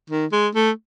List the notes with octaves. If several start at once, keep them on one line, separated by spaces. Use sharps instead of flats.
D#3
G#3
A3